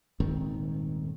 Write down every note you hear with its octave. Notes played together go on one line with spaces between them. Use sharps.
D#1 G#2 D#3 C4